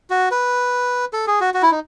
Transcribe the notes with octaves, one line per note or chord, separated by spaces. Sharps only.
F#4
B4
A4
G#4
F#4
F#4
E4
D#4